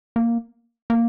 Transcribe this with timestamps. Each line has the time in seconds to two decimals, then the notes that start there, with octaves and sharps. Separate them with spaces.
0.16 A#3
0.90 A#3